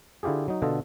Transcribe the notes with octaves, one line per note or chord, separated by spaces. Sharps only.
D3 E4 F4 G4 G#4
F#3 D#4
B2 D3 F4 A4 D#5